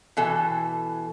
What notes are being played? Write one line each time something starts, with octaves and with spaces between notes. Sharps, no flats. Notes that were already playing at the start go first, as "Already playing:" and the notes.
B2 E3 A4